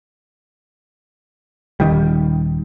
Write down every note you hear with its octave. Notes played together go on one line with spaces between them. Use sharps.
D#1 D#3 G3